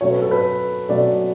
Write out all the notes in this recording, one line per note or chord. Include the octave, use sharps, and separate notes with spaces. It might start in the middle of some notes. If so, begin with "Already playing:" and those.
B2 F#3 A3 C#4 C#5
B4
A4
B4
B2 F#3 A3 C#4 D5